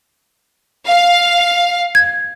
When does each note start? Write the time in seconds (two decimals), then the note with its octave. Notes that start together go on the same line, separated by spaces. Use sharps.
0.88 F5
1.95 G#6